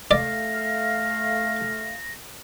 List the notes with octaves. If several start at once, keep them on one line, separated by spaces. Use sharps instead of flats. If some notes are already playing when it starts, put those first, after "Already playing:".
A3 D5 F5 A#6